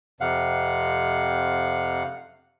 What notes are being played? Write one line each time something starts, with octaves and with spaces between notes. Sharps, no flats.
F2 C3 F5 F#5